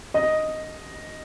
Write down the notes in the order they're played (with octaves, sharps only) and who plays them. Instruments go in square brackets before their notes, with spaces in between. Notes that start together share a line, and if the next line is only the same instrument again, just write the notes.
[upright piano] D#5